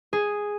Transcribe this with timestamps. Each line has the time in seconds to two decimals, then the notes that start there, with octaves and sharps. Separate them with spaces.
0.13 G#4